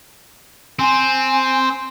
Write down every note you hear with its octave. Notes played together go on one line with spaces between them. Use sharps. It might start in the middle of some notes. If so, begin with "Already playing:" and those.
C4 G#5